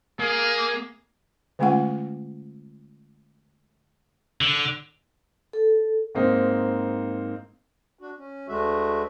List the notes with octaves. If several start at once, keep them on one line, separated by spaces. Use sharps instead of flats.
A#3 G#4
D3 G#3 A3 C#4 F4 F#5
D3
A4
G#2 A#3 C4 D#4
D4 F#4
C#4
D2 D3 G#3 A3 F#4 E5